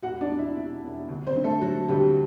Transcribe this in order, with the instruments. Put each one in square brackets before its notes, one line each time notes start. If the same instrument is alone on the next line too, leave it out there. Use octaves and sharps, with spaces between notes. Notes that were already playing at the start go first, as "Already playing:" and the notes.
[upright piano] E1 F#4 F#5
D4 D5
E2
E4 E5
B2
E1
D2
C4 C5
D3
A3 A4
F#3 F#4
D2 G3 G4